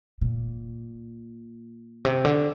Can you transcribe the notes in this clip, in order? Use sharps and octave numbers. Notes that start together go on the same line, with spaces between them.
A#2
C3
D3